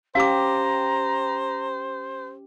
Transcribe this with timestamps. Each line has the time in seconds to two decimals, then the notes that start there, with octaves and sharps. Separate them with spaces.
0.15 C#4 G4 C5 F5 A#5 D6